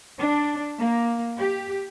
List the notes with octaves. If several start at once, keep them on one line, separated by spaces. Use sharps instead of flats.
D4
A#3
G4